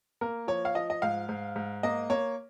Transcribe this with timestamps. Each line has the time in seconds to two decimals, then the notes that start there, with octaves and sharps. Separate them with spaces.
0.21 A#3 A#4
0.48 F3 C#5
0.65 F5
0.75 F3 D#5
0.90 D#5
1.02 G#2 F5
1.29 G#2
1.56 G#2
1.83 A#3 D#5
2.10 A#3 C#5